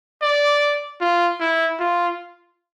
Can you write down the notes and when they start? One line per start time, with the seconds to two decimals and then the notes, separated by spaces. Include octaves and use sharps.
0.22 D5
1.01 F4
1.40 E4
1.80 F4